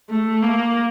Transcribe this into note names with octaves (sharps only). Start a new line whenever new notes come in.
A3
A#3